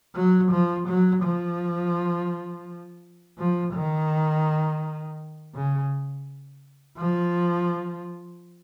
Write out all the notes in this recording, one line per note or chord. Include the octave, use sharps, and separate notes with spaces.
F#3
F3
F#3
F3
F3
D#3
C#3
F3